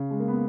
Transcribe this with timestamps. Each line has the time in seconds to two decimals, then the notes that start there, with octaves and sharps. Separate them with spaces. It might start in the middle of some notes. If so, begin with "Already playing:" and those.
Already playing: C#3
0.11 G#3
0.20 A#3
0.28 B3